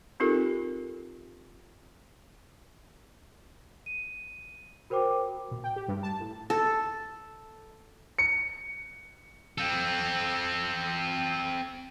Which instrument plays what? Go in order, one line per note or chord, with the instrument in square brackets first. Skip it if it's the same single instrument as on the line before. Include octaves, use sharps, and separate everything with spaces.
[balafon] C4 D#4 F4 G4 A4 A#4
[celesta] D#7
F#4 A#4 C5 G5 D6
[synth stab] A#2
G5
G4
G2
A5
A2
[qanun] A4
[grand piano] C#7
[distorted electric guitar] C4 A4